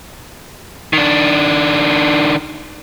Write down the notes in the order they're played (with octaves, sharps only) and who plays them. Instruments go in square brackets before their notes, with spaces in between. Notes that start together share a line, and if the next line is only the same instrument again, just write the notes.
[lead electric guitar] D#3 D4